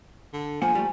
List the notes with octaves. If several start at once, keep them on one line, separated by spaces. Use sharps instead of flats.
D3
F3 A#3 F#5 G#5
G3 A3